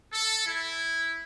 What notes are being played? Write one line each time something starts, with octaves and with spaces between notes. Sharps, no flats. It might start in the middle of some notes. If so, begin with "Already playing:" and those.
A4
E4